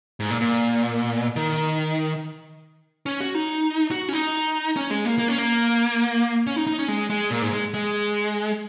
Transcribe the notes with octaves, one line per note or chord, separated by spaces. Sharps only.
G#2
A#2
A#2
D#3
C#4
F#4
D#4
F#4
C#4
D#4
C#4
G#3
A#3
A#3
C#4
A#3
C#4
D#4
D#4
C#4
G#3
G#3
A#2
G#2
G#3
G#3